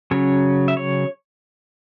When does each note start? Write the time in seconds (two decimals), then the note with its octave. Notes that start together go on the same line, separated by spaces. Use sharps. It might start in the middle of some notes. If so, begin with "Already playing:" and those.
0.11 C#3 F#3 C#4 C#5
0.68 E5
0.77 C#5